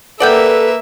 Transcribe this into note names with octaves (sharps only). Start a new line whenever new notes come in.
A#3 A4 B4 D5 E5 F#5 G5